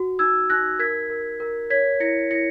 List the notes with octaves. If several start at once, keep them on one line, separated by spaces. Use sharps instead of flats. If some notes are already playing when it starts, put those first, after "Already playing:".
Already playing: F#4
D#4 E6 G#6
D#4 F#6 A#6
A#4 G#6 B6
A#4
A#4
C#5 G#6 B6
E4 A#6 C#7
E4 A#6 C#7